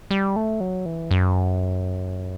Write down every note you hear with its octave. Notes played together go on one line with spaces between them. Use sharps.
G3
A3
F#3
E3
F#2